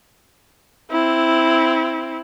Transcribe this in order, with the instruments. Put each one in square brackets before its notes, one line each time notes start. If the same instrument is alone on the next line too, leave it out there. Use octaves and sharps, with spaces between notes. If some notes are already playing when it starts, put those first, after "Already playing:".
[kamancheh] C4 E4